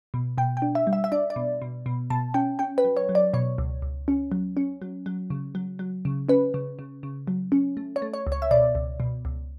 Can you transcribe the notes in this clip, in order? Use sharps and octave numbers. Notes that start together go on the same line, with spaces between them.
B2
B2 G5
G5
D4
E5
G3
E5
E5
D4 D5
D5
B2
B2
B2
B2 A5
C#4 G5
C#4 G5
B4
F#3
C#5
F#3
D5
B2 C#5
C#2
C#2
C#4
F#3
C#4
F#3
F#3
C#3
F#3
F#3
C#3
C#4 B4
C#3
C#3
C#3
F#3
C#4
A3
C#5
A3
C#5
C#2
C#5
E5
B2 D5
C#2
B2
C#2